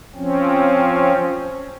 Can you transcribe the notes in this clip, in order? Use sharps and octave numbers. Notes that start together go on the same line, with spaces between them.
F3 C4 C#4